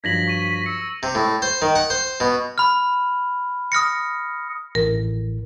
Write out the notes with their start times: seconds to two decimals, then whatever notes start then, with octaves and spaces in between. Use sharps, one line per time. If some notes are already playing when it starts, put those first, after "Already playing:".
0.04 G2 F3 F#3 G#6 A#6 B6 F#7
0.28 C#6 D#7
0.66 E6 C#7
1.03 C3
1.15 A2
1.42 C5
1.62 D#3
1.75 F#5
1.90 C5
2.20 B2
2.58 B5 F6
3.72 D#6 F6 A#6 C#7
4.75 A1 A2 A#4